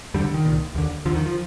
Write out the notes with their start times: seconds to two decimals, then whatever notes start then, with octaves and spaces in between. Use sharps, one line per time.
0.14 F2 D3 G3
0.24 D3
0.34 D#3
0.45 C2 A#2
0.75 D#2 D3
1.06 D#2 D3 F3
1.15 D#3
1.26 F3